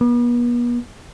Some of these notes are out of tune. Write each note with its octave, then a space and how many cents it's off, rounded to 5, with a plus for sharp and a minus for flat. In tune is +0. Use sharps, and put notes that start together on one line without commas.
B3 -40